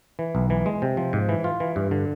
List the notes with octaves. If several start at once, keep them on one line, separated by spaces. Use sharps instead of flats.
E3
B1
E3
G#3
C3
F3
G#2
E3
F4
E3
G2
D3